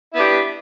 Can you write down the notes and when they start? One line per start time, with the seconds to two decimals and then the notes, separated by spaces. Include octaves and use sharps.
0.11 E4
0.14 B3
0.17 D4
0.20 G4